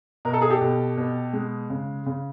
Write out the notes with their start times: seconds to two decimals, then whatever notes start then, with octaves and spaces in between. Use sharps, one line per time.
0.25 B2 A#4
0.33 A4
0.42 G#4
0.50 G4 A4
0.61 B2
0.97 B2
1.33 G#3
1.70 C#3
2.06 C#3